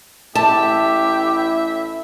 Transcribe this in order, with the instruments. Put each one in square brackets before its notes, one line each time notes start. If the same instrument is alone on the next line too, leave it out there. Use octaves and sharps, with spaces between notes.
[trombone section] A1 A2 E4 [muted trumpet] G4 [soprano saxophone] E5 [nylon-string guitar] A5